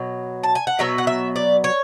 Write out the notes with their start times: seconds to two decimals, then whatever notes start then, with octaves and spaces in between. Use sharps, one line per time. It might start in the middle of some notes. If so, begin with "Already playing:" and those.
Already playing: B2 F#3
0.43 A5
0.55 G#5
0.67 F#5
0.78 B2 F#3 B3 E5
0.98 F#5
1.07 E5
1.36 D5
1.64 C#5